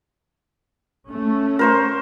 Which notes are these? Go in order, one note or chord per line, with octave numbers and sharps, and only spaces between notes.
A3 C#4
A#4 C5 C#6